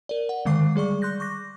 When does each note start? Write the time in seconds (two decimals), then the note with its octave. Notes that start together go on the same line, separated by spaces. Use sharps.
0.09 A#4 D5
0.29 F#5
0.45 D3 D#3 G#3 F5 D6 C7
0.75 G3 G#4 D5 C#6
1.02 C6 F#6 G6 A#6
1.20 C#6 D6 A#6